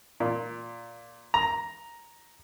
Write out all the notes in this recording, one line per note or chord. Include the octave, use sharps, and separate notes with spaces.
A#2
A#5